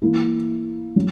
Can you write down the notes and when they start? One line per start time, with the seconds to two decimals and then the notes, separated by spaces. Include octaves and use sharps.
0.02 E3 A#3 E4
0.96 F#3